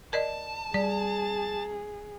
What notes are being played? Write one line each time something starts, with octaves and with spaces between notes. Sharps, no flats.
A#4 D5 D#5 A5
G3 G#4 D5